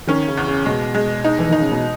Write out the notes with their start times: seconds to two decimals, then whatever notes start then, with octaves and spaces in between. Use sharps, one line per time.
0.07 D#3 C#4
0.28 C#3
0.37 E2
0.47 C#3
0.66 B2 G#3
0.95 G#3
1.24 D#4
1.39 E3
1.49 D#3 D#4
1.60 C#3
1.72 B2